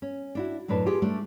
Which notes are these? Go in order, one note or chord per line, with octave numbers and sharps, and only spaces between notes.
C#4
D4 E4 F#4
F#2 A2 D4 B4 A5
F4 G4 G#4
G3 A3 D4